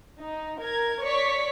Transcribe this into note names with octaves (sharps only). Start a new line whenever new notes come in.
D#4
A#4 G#6
C#5 D5 C#6 B6